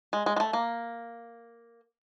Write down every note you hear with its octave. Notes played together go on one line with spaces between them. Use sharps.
G#3
G#3
G#3
A3
A#3